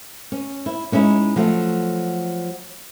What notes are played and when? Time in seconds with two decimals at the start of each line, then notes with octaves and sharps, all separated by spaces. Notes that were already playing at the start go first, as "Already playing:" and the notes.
0.32 C#4
0.66 E4
0.92 G#3 C#4 D#4 E4
1.36 F3 F#3 A3